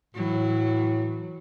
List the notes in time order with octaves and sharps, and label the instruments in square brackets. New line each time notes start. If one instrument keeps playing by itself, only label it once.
[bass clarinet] A2 [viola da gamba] E3 F#3